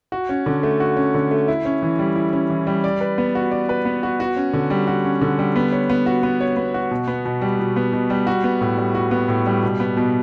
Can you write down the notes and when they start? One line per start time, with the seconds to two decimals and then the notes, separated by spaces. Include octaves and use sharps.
0.12 F#4
0.29 C#4
0.46 D3
0.63 A3
0.80 F#4
0.97 C#4
1.14 D3
1.31 A3
1.48 E4
1.65 C#4
1.82 E3
1.99 G3
2.16 E4
2.33 C#4
2.50 E3
2.67 G3
2.84 D5
3.01 B4
3.18 B3
3.35 F#4
3.51 D5
3.69 B4
3.85 B3
4.03 F#4
4.20 F#4
4.36 C#4
4.53 D3
4.70 G3
4.87 F#4
5.05 C#4
5.21 D3
5.39 G3
5.56 B3
5.72 C#5
5.90 B3
6.06 F#4
6.23 B3
6.41 C#5
6.57 B3
6.74 F#4
6.91 B2
7.07 B3
7.25 B2
7.41 G3
7.59 B2
7.76 B3
7.93 B2
8.10 G3
8.27 F#4
8.44 B3
8.61 A2
8.78 G3
8.95 F#4
9.11 B3
9.28 A2
9.46 G3
9.63 B2
9.80 B3
9.97 B2